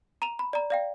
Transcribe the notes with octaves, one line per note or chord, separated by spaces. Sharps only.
A#5 D#7 F7
B5
D5 A#5
D5 F5 G5